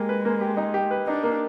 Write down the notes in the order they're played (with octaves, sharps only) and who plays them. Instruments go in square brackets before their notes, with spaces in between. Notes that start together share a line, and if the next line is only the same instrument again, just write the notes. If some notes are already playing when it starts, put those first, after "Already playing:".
Already playing: [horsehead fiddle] G#3 [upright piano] A#3 G4
[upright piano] B4
A#3
G4
D#4
G4
B4
[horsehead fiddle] D4 [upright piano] D#4
[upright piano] A#3